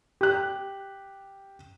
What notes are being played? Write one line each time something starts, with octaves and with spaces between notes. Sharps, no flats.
G4 F#6